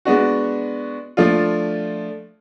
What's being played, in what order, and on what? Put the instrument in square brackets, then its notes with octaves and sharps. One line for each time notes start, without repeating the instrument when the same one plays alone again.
[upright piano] G#3 B3 D4 F#4
F3 A3 D4 F4